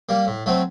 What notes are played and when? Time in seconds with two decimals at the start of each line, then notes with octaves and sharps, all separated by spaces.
0.09 G3 A#3
0.27 A2
0.46 F#3 A3 C4